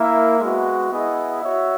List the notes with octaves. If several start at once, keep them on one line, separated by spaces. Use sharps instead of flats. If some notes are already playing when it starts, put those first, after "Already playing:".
Already playing: A#3 E4 A#4 E5
G#3 B3 F#4
B3 E4 G#4 D#5
F#4 C#5 E5